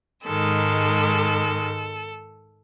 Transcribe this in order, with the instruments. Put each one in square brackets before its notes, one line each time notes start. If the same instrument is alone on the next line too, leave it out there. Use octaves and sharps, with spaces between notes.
[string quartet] G#2 D#3 G#3 A4